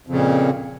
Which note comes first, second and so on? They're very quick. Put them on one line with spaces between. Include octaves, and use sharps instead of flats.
F2 C#3 A#2